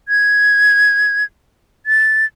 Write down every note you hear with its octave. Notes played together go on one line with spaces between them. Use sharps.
G#6
A6